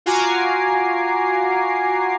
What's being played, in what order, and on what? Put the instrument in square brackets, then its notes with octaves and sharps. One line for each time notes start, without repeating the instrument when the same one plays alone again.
[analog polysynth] F4 F#4 G#5 A#5 D6 C7